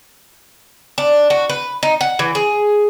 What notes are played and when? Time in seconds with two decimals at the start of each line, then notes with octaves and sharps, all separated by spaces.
0.98 D4
1.30 F#4
1.49 B4
1.83 D#4
2.01 F#5
2.19 E3
2.35 G#4